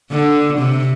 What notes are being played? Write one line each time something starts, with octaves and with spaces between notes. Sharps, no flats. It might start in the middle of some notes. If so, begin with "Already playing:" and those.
D3
C3